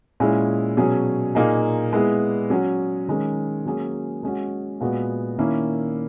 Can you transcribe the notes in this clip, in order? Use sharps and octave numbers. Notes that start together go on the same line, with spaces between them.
A#2 G#3 C#4 E4 G#4
B2 F#3 C#4 G#4
A#2 A#3 D#4 G#4
G#3 B3 E4 G#4
F#3 C#4 F#4
D#3 G#3 C#4
F#3 A#3 C#4 G#4
G#3 C#4 F#4
A#2 G#3 B3 F#4
D#3 A#3 C#4 E4